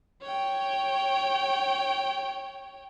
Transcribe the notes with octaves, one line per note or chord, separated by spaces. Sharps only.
C#5 G5